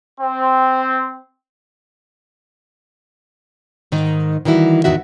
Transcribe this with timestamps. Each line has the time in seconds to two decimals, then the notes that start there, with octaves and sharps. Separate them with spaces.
0.20 C4
3.92 G#2 D#3 D#4
4.45 D#3 E3 G3 E4 F#4
4.84 E2 G#2 D#3 F#4 E5